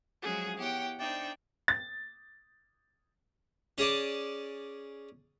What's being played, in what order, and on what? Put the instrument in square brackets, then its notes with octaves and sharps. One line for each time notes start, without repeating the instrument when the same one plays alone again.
[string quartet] F3 F#3 G#3 C#4 F#4 G#4
B3 E4 G4 C#5 F#5 G5
D4 D#4 C5 D5 E5 G5
[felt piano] A6
[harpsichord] C#4 G#4 D5 A5